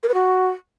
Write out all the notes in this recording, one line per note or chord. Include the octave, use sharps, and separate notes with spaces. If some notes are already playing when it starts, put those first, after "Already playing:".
A#4
B4
F#4